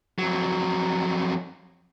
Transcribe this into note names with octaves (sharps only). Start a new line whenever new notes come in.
F2 F#3